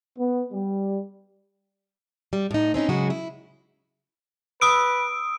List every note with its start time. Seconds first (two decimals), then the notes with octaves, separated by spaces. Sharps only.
0.19 B3
0.53 G3
2.33 G3
2.51 A2 D#4
2.74 C4 C#4 D#4 E4
2.89 C#3 F#3 G#3 F#4
3.10 E4
4.61 B4 D#6 E6 D7